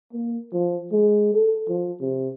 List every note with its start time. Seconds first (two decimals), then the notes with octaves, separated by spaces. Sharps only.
0.13 A#3
0.53 F3
0.92 G#3
1.34 A4
1.68 F3
2.00 C3